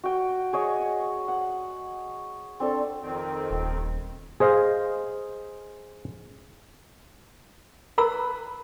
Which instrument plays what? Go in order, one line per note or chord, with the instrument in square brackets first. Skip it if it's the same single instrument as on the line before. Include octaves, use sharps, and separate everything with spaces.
[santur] F#4 G5
G#4 C#5 D#5
F#5
C4 D4 A4
[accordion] F2 D#3 C4
[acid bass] D#1
[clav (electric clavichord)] G#4 C5 D#5 F5
[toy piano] A#4 A#5 E6 [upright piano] B4 B5